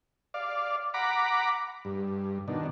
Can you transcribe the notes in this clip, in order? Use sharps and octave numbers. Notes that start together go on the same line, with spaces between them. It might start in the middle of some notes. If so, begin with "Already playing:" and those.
D5 F5
F#5 A#5 B5 D6
G2
B2 D#3 D4